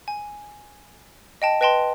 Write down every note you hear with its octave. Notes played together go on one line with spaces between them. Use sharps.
G#5
D#5 G5 A5
B4 D#5 G5 A5 C6